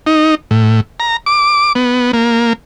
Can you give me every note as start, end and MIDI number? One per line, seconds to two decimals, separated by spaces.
0.07 0.35 63
0.51 0.81 45
1.00 1.17 82
1.26 1.73 86
1.75 2.12 59
2.13 2.53 58